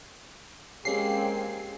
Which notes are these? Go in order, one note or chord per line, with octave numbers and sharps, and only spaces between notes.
G#3 A#3 C4 C#4 G4 G#4 C7